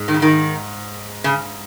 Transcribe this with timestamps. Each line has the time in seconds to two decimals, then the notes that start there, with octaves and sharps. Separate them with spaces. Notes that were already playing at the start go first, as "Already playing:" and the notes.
Already playing: G#2 G#3
0.08 D#3
0.14 C#3
0.22 D#3
1.24 C#3